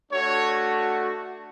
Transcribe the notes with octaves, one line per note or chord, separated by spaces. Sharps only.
A3 D4 F#4 C#5